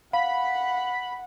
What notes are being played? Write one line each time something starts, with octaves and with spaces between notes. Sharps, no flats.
F5 F#5 B5